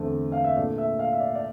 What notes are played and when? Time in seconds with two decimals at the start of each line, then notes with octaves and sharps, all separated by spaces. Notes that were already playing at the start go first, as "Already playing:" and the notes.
Already playing: E2 D3 A3 C4
0.32 F5
0.44 E5
0.57 A#2 A3 D4 D5
0.78 E5
0.99 F5
1.13 E5
1.20 D5
1.35 D5